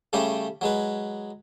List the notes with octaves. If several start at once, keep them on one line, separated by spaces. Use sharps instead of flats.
C#3 G3 A3 C#4 G4
F#3 G#3 B4